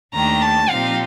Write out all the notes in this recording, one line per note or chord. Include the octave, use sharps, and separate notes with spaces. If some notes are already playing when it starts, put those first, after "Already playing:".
D#2 D#3 A3 D4 G4 A#5
A5
A#2 F3 C4 D#4 G4 F5